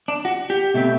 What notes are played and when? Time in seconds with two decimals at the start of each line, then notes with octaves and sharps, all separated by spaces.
0.08 D4
0.25 F#4
0.50 G4
0.74 B2 A3 C4